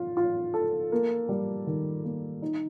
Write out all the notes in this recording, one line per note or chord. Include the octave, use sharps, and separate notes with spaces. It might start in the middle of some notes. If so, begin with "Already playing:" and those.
Already playing: F4
F4
A4
A#3
G3
D#3
A#3
D#4